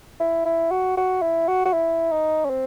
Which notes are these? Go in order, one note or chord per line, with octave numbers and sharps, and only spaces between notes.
E4
E4
F#4
F#4
E4
F#4
F#4
E4
D#4
C#4
C4